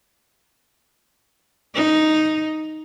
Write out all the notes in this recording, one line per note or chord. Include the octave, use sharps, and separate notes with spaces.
D#4